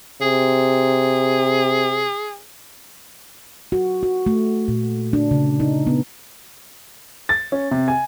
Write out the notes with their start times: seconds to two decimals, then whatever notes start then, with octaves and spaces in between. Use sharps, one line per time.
0.22 C3 G#4
3.72 F#4
4.03 F#4
4.26 A3
4.68 A#2
5.13 D4
5.31 C#3
5.60 D#4
5.87 B3
7.29 A6
7.52 C#4
7.71 C3
7.88 G#5